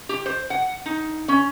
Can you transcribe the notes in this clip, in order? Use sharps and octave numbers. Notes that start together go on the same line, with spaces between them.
G4
C5
F#5
D#4
C#4